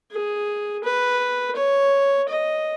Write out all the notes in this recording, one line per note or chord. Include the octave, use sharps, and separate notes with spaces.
G#4
B4
C#5
D#5